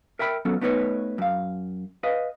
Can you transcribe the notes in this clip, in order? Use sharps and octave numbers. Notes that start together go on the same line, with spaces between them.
A#4 E5 G5 B5
F#3 B3 C#4 A4
A3 B3 D#4 B4 C#5
F#2 F5
B4 D#5 F5